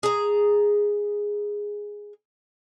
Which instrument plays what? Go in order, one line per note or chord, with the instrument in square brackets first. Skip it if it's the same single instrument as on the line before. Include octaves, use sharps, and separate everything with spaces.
[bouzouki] G#4 A#5